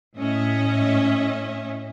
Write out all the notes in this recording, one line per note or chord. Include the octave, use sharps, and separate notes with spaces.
A2 C#4 D#5 E5